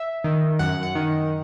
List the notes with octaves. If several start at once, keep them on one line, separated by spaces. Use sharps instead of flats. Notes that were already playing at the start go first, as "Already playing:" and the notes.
Already playing: E5
D#3
F#2 F#5
F#5
D#3